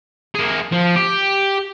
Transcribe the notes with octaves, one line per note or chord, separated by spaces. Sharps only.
A#3 G#4
F3
G4